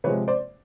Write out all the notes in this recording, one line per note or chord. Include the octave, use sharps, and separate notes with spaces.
C3 F3 G#3 B4 C#5
C5 D5